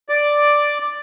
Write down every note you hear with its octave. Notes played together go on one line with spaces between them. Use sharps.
D5